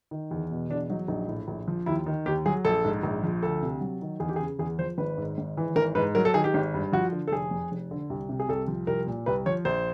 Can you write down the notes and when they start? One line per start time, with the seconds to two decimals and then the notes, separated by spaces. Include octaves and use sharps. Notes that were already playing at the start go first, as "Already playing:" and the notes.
0.11 D#3
0.31 E2
0.51 B2
0.69 E2 D4
0.90 F#3 D#4
1.08 A#1 D#4
1.28 A2
1.48 A#1
1.68 F3
1.86 D#2 E4
2.06 D#3
2.26 D#2 G4
2.46 F#3 G#4
2.65 A#1 A4
2.85 G#2
3.03 A#1
3.24 F3
3.43 D2 A4
3.62 C3
3.81 F#3
4.02 D#3
4.20 E2 G#4
4.29 G4
4.36 G#4
4.40 C#3
4.59 E2 G#4
4.79 F3 C5
4.98 G#1 B4
5.18 G#2
5.38 G#1
5.57 E3
5.76 G#1 A#4
5.95 G#2 B4
6.15 F#3 A#4
6.25 A4
6.34 D#3 G#4
6.44 G4
6.54 G#1
6.74 G2
6.93 F3 F#4
7.12 D3
7.28 A4
7.32 F1 G#4
7.51 F2
7.72 F1
7.91 D3
8.10 C2
8.29 C3
8.40 G#4
8.48 C2 A4
8.68 F3
8.87 C2 A#4
9.07 A#2
9.26 C2 B4
9.46 F3 C#5
9.65 A#1 C5